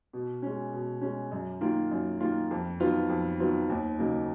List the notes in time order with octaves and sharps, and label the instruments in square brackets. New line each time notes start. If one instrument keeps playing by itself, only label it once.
[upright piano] B2
G#3 C#4
B2
G#3 C#4
F#2
D#3 A#3 F4
F#2
D#3 A#3 F4
F2
D#3 F#3 B3 F4
F2
D#3 F#3 B3 F4
D#2
C#3 F#3 A#3 D#4